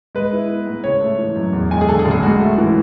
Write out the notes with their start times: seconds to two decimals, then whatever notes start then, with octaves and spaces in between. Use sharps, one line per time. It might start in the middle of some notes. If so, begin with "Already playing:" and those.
0.15 G#3 B4
0.33 E4
0.49 B3
0.67 G#2
0.84 C#3 C#5
1.01 A3
1.19 E3
1.36 F#2
1.53 E2
1.71 G#3 G#5
1.81 G#4
1.89 D3 A4
1.99 G#4
2.05 F#1
2.11 G#4
2.23 G#2 F#4
2.40 A3
2.58 E3